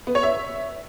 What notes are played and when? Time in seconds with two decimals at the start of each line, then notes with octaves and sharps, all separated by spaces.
0.07 B3
0.15 C#5
0.23 E5